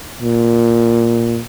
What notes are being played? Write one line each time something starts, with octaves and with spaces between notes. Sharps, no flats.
A#2